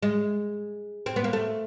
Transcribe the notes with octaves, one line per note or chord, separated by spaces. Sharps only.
G#3
C4
B3
A#3
A3